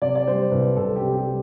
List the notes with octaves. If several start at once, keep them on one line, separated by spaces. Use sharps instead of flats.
C3 D5
D5
G3 C5
C2 B4
C2 A4
G4
C3
G4
G3